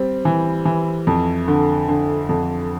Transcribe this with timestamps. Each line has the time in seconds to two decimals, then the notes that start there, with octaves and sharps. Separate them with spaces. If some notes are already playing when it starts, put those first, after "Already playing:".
Already playing: G3 C4
0.25 E3
0.65 E3
1.07 F2
1.48 D3
1.88 D3
2.29 F2